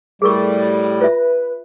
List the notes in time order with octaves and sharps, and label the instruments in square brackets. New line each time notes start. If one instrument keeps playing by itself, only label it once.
[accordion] A2 G3 [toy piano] G#4 A#4 C#6
[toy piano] F4 E5 [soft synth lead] B4